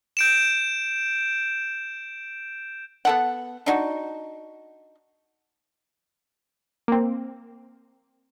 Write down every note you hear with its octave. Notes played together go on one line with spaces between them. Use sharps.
G6 D7 E7
B3 A4 F#5
D4 D#4 F#4
A#3 C4